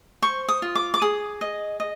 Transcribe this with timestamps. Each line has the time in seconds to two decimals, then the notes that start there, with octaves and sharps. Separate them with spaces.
0.22 C5 C#6
0.48 D#6
0.62 F4
0.75 D6
0.94 D6
1.02 G#4 D#6
1.41 D#5
1.80 D#5